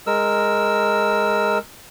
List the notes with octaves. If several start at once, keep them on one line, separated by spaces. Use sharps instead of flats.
G#3 A#4 E6